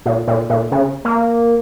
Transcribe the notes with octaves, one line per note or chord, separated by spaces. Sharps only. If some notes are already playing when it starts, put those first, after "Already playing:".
A#2
A#2
A#2
C#3
A#3